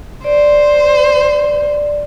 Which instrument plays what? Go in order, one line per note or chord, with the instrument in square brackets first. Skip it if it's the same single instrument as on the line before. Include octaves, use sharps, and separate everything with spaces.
[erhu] C5 [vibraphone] D5